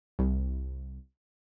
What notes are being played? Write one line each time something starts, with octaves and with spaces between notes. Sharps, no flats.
C2